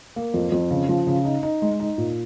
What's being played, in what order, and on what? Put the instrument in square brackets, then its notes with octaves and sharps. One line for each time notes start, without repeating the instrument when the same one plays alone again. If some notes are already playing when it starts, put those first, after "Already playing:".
[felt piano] A#3
F2
F2
C#3
F3
C#3
D#4
D#4
G#3
D#4
A#2